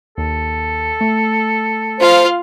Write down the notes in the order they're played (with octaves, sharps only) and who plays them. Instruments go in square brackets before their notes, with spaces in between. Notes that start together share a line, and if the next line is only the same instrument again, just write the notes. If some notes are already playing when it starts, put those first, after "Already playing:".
[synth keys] D#2 [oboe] A4
[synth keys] A3
[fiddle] F4 F5 [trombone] C5